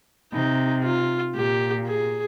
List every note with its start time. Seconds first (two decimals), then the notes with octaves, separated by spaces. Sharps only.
0.33 C3 D#4
0.84 F4
1.35 A#2 G4
1.87 G#4